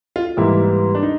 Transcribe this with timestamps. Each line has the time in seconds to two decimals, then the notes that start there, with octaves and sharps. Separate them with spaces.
0.16 F4
0.37 G#2 E3 G3 A#3 E4
0.95 D4
1.03 D#4